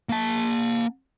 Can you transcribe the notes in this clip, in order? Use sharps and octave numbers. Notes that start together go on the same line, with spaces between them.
A#3 A5